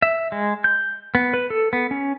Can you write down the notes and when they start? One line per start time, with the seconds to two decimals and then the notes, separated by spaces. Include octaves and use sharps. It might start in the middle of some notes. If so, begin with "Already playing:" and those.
0.02 E5
0.32 G#3
0.64 G6
1.15 B3
1.34 B4
1.50 A4
1.73 B3
1.91 C#4